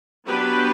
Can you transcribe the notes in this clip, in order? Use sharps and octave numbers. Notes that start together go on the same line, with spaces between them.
F#3 B3 D4 G4 B4